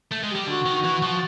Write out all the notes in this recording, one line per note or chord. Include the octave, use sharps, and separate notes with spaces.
A3
G#3
G4
G3
D3 F#4
D#3
E3
F3